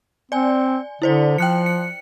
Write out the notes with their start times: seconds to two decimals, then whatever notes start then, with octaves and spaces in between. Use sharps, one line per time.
0.32 C4 D5 G#5
1.02 D3 E4 C5 D5
1.38 F3 G5 F#6 C#7
1.66 C#7